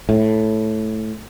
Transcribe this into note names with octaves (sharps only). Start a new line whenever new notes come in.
A2